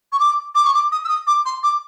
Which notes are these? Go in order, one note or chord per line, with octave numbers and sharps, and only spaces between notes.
C#6
D6
D6
C#6
D6
D#6
E6
D#6
D6
C6
D6